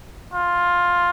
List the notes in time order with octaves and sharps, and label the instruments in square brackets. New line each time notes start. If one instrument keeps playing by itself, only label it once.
[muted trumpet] F4